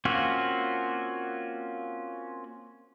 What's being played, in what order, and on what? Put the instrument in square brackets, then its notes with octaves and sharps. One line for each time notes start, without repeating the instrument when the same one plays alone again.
[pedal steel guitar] A#3 C4 C#4 F4 F#4